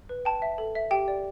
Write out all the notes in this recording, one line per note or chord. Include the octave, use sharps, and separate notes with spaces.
B4
G5 A5
E5
A4
E5
G4 G5
D5